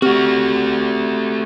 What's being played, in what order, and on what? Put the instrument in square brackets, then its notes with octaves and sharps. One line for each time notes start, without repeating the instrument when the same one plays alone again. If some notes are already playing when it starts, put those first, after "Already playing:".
[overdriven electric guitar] A3 F#4 [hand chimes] C4 G4